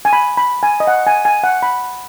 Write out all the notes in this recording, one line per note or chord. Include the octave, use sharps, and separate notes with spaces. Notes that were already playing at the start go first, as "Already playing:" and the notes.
G#5
B5
B5
G#5
D#5
F#5
G#5
G#5
F#5
B5